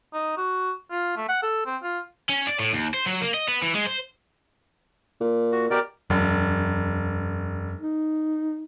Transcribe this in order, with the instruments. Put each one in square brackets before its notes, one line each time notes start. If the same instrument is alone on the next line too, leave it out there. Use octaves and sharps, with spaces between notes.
[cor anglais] D#4
F#4
F4
A3
F#5
A4
C4
F4
[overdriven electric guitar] C#4
D5
A2
D#2
C5
F#3
A#3
D#5
B3
E3
G#3
C5
[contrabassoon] A#2
[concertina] F#4
[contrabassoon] B2 [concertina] G4 A#4 D5
[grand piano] E1 [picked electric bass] F#2
[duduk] D#4